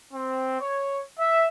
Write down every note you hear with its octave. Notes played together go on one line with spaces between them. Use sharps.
C4
C#5
E5